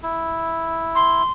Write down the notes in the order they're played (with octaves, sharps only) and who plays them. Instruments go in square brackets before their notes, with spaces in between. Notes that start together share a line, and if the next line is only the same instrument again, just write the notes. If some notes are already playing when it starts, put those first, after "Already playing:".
[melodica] E4
[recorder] C6